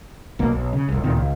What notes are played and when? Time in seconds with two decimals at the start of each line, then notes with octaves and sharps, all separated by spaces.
0.39 B1 B2 A#3
0.52 B1
0.73 C#3
0.89 F1 C2
1.04 D2 A#2 D#3 C4
1.17 C#2